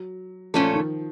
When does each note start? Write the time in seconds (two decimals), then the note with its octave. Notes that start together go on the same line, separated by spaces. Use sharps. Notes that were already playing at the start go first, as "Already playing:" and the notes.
Already playing: F#3
0.54 A#2 F3 A3 C#4 A4
0.73 D#3